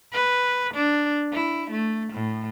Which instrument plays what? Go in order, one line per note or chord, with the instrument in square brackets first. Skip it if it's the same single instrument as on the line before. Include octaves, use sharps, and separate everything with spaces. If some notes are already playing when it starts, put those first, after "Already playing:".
[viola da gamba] B4
D4
E4
A3
A2